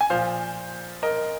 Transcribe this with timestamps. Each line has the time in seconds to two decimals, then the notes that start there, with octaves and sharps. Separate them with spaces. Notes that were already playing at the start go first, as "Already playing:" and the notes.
0.01 G#5
0.10 A#2 F3 C5 F5
1.03 A#4 D#5